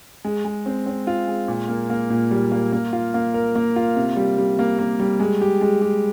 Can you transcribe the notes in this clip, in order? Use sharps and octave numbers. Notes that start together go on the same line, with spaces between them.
G#3
G#3
C4
C4
F4
G#3
A#2
A#3
A#3
A#2
G3
A#3
A#3
F4
A#3
A#4
A#3
F4
C3
G3
G3
A#3
A#3
G3
G#3
G4
G#3
G4